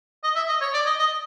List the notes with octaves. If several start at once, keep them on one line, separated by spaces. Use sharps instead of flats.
D#5
E5
D#5
C#5
D5
D#5
D#5